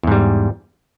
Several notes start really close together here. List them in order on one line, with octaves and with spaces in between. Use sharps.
E2 G#2 G3